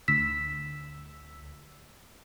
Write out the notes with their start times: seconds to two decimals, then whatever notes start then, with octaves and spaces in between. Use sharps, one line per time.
0.08 D2 E6 B6